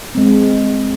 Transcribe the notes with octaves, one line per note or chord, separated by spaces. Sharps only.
G#3 C4